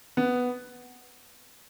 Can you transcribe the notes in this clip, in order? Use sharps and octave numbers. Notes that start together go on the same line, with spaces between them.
B3